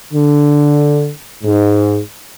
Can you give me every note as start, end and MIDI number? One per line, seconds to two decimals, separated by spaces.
0.14 1.10 50
1.44 1.99 44